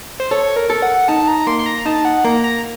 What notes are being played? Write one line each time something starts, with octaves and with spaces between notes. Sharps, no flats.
C5
A4 C#5
A#4
A4
F#5
D#4 A5
A#5
A#3 C6
C6
A#5
D#4 A5
F#5
A#3 A#5
A#5